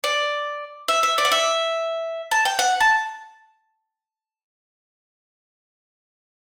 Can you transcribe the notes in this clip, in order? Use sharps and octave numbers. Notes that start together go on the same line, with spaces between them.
D5
E5
E5
D5
F#5
E5
A5
G5
F#5
A5